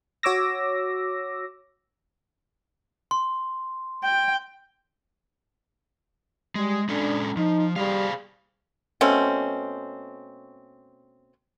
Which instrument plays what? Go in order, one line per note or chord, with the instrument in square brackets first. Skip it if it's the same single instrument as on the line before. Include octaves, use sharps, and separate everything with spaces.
[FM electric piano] F#4 C#5 D6 E6 A#6
[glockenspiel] C6
[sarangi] G5
[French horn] G3 [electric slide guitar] G#3
[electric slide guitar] G#3 C#4 A4 [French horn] D4
[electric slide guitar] F3 [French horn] D#4
[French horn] G3 [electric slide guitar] G#4 C5 F5
[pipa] B2 A3 C4 C#4